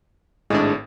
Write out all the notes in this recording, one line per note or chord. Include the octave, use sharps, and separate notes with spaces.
G#1 A2 G#3 D4